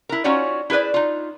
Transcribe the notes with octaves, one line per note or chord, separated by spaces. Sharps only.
E4 A#4
C#4 D#4 F4 F#4 C#5 D5
E4 G#4 B4 C5 D5
D#4 F4